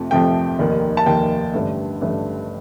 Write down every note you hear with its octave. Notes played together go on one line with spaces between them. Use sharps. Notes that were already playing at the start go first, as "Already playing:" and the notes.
Already playing: F2 C3 F3 A3
F2 C3 F3 A3 G5
F1 D#2 D#3 A#3
A5
F1 D#2 D#3 A#3 G5
A1 G2 D3 A3
A1 G2 D3 A3